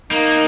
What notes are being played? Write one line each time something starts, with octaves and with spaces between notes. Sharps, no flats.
A#3 D#4